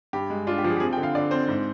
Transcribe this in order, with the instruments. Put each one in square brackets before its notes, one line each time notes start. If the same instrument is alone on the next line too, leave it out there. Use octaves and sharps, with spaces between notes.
[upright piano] G2 G4
G#3
D4 F4
G4
F3
G#4
G4
C4 G#4
G5
D3
F5
D3 D5
C4 C5
G#2